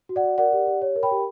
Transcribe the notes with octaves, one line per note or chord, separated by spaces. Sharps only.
F#4
D5 F#5
F#4
A#4 D5 F#5
G4
G4
C#5
A#4
G5 B5
G4